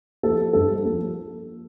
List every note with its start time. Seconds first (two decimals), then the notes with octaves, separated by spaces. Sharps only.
0.23 F3 A#3 A4
0.53 G2 A4
0.85 F3 A#3